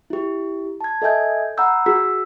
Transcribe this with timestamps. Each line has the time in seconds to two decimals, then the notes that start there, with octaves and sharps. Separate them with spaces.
0.10 E4 G4
0.81 A5 G#6
1.02 A4 D#5 E5 G#5 G6 G#6
1.57 F#5 A#5 B5 E6 G6
1.86 F#4 G#4 E6 B6